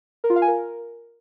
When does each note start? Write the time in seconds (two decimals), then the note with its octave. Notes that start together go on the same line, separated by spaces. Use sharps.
0.24 A#4
0.30 F4
0.36 F5
0.42 G#5
0.48 A#4